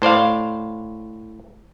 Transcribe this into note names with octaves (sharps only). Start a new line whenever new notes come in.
A2 C5 D5 F5